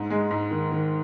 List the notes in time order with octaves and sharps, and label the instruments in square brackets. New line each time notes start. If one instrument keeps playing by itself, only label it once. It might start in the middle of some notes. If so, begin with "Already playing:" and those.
Already playing: [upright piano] G#2
G#3
G#2
D#3
D#3